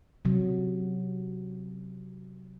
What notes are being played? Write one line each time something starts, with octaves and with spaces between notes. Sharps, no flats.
C3 F#3